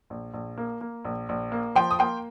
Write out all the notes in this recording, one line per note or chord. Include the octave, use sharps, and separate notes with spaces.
A#1
A#1
A#3
A#3
A#1
A#1
A#3
F3 G5 C6
D#6
A#3 G5 C6